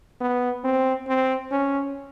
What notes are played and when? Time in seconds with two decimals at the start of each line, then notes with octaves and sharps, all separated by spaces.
0.21 B3
0.64 C4
1.07 C4
1.51 C#4